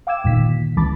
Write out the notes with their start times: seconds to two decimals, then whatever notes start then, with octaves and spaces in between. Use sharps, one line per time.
0.07 F5 G5 D6 E6 G#6 E7
0.24 G1 D2 A#2 D#3 B6
0.77 C#2 E3 A5 B5 D6 A6